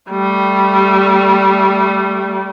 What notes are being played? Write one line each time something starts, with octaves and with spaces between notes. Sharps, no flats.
G3 A3